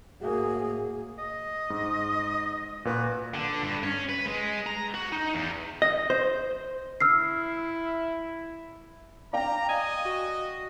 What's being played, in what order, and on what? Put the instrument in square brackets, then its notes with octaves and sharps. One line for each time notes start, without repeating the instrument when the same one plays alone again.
[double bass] A2 A#3 [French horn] F#4 [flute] G#4
[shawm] D#5
[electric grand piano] G#2
[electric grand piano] A#2 B4 [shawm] F#4
[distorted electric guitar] D3
G2
C#4
B4
G#3
A#5
F#4
D#4
E2
[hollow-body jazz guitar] D#5
C5
[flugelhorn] E4 [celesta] E6 F6 C7
[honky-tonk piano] D5 F5 G5 [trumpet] A#5
[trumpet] D#5 [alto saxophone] G#5
[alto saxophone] F#4